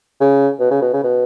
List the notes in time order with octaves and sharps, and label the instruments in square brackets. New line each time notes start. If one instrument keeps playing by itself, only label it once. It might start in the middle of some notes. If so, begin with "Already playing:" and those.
[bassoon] C#3
B2
C#3
B2
C#3
B2